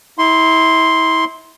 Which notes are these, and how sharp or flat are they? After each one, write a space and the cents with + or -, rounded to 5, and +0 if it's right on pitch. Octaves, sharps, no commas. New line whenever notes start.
E4 -35 C6 +0